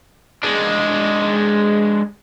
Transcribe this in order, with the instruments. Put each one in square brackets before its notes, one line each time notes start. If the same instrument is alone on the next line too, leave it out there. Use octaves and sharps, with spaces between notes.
[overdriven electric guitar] G#3 D4